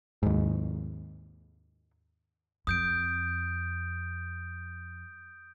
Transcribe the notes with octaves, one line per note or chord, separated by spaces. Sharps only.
D#2 G#2
F2 D#6 G6 D7